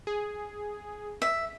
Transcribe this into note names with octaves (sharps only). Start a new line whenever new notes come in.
G#4
E5